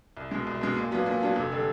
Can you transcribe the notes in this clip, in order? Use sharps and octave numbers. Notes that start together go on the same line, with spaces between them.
C2
B2 G#3
C2
B2 G#3
A#2
F#3 B3 D4 F4
A#2
F#3 B3 D4 F4
F1
D3 G3